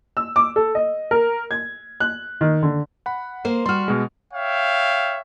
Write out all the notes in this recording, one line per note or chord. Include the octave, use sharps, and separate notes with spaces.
E6
D6
A4
D#5
A#4
G#6
F#6
D#3
D3
F#5 B5
A#3 C5
G3 F#4 C6 F6
B2 G#3
C#5 E5 F5 G5